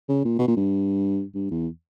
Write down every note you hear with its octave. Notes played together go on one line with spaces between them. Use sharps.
C#3
A#2
B2
A#2
G2
G2
E2